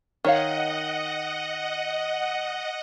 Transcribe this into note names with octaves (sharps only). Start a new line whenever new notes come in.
D#3 C#5 D#5 F5 F#5